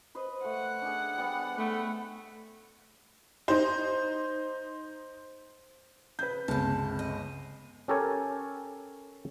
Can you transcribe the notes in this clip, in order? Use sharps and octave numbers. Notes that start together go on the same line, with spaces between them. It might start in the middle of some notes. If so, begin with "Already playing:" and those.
B4 C5 D#5
A3 F#5
D4 G#4
G3 B3
A3 B3
D#4 C5
C#3 B4 G6
G1 C#2 C3 A5
D#5
C#4 G4 A4 A#4 C#5 G#5